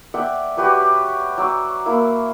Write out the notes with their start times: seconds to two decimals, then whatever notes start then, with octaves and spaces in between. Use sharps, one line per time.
0.14 D5 E5 F#5 G5
0.57 F#4 G4 B4 C#5
1.38 F#3 D6 E6
1.86 A#3 E4